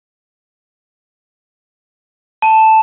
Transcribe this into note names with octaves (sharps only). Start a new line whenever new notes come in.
A5